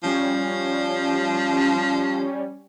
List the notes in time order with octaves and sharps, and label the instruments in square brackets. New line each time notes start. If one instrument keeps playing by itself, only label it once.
[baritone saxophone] F3 [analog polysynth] G3 C#4